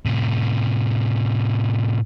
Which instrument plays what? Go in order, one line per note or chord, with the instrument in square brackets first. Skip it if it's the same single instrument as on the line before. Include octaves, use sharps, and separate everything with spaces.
[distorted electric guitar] A2 C3